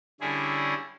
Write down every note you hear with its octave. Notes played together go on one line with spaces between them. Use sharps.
D3 G3 C#4 E4 G#4